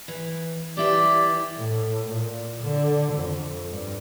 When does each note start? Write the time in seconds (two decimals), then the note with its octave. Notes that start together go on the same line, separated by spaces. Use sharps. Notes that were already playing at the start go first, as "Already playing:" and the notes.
0.08 E3
0.77 E3 E4 G4 D5
1.56 A2
2.08 A#2
2.62 D3
3.13 F2
3.70 G2